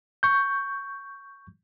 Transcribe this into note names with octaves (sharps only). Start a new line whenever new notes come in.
C#6 G6